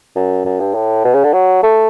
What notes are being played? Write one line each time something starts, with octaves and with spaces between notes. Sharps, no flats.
F#2
F#2
G2
A2
B2
C#3
D3
F#3
A3